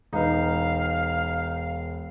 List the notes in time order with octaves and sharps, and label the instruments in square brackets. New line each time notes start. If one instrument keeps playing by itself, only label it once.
[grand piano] E1 B4 [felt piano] D#4 [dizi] F5